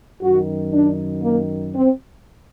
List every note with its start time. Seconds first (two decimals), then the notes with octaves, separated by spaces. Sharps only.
0.22 F#2 D#3 F#4
0.73 D4
1.23 A#3
1.74 C4